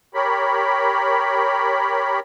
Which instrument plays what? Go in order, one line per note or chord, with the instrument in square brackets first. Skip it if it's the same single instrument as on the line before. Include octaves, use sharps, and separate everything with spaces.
[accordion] G4 A#4 C#5 B5